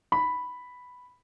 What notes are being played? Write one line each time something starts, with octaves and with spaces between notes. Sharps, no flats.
B5